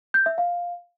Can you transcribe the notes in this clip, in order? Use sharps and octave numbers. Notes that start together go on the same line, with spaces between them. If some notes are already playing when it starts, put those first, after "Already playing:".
G6
E5
F5